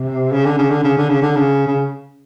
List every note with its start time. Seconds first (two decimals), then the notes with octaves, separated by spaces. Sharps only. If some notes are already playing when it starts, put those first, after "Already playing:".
Already playing: C3
0.32 C#3
0.46 D3
0.58 C#3
0.70 D3
0.84 C#3
0.97 D3
1.09 C#3
1.22 D3
1.36 C#3
1.67 C#3